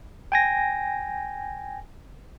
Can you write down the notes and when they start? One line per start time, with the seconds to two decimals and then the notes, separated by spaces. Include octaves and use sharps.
0.32 G5 G#5 A#6